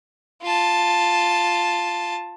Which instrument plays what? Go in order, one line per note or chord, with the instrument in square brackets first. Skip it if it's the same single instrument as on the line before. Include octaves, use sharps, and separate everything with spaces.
[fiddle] F4 A5